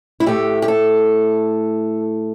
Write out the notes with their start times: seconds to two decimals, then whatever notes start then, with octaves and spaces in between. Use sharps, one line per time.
0.20 E4
0.26 A2 A3 G4
0.62 G4
0.68 A4